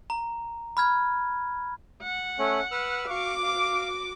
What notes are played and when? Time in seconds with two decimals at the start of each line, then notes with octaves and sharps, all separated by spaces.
0.10 A#5
0.77 B5 F6 G#6
2.03 F#5
2.39 A3 C#4
2.71 B4 E6 F6
3.10 F#4 F5 C#6 D6
3.43 F5